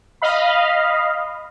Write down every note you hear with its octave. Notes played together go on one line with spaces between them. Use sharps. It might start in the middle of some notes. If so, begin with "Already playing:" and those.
D#5 F5 B5